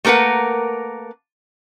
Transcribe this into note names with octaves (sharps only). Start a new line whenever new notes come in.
A3 A#3 A#4 B4 F#5